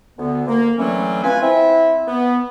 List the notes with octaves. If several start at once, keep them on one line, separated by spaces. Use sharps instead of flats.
D2 D3 B3
A#3
D3 E3 F#3 A3 C4 C#4
F4 B4 G#5
C4 E4 E5
B3